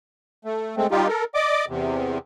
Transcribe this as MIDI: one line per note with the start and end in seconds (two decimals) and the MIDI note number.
0.45 0.76 57
0.77 0.87 56
0.77 0.87 57
0.77 0.87 60
0.91 1.08 55
0.91 1.08 63
0.91 1.08 65
0.91 1.08 67
1.08 1.24 69
1.08 1.24 70
1.34 1.65 74
1.34 1.65 75
1.34 1.65 86
1.68 2.18 40
1.68 2.18 48